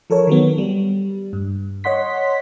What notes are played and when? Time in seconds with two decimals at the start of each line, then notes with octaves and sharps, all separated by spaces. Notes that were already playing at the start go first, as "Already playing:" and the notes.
0.10 F3 A4 A#4 C#5
0.27 D#3 F#3 B3
0.58 G3
1.33 G2
1.84 C#5 D#5 F#5 C6 B6